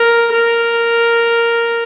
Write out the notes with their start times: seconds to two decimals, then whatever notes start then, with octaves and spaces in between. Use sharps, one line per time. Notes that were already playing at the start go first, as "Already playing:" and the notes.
Already playing: A#4
0.33 A#4